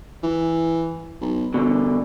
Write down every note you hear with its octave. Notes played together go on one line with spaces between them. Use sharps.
E3
B1
G1 B2 D3